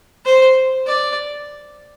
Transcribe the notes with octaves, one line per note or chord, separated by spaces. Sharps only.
C5
D5